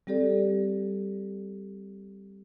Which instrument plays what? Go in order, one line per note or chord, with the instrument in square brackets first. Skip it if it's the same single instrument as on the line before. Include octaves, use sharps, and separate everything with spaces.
[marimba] G3 C4 G4 A4 D5